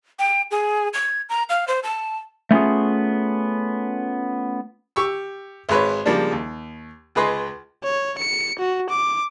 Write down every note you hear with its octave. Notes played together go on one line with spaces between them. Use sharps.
G5
G#4
G#6
A#5
F5
C5
A5
A3 B3 C#4 F4 G#4
G4 C#6 E6
G#1 G#3 B4 C#5
C#3 F3 G3 G#3 A#3 D4
D#2
C#2 G#4 B4 D#5 C6
C#5
C#7
F#4
D6